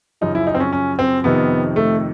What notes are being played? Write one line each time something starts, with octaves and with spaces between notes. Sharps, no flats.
F#2 C#3 F3 D#4
E4
D#4
C4
C#4
C#4
C4
F2 C3 D#3 B3
A3